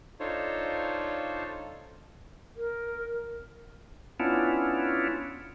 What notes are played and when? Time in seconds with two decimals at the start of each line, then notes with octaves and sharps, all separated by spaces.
0.20 D4 D#4 F4 A4 C5 C#5
2.56 A#4
4.20 B3 C#4 D4 E4 F4